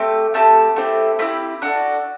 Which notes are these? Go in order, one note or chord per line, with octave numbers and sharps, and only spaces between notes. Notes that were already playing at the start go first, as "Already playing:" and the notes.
Already playing: A3 C4 G4
A3 C4 G4 A5
A3 C4 E4 G4
A3 C4 E4 G4 B5
D4 F#4 A4